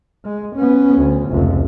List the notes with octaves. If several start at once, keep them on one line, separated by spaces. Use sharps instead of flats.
G#3
B3 C#4
D2
F1 C#2